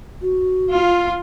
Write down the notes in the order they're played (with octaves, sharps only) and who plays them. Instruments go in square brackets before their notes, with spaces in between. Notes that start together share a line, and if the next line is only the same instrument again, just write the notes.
[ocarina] F#4
[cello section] F4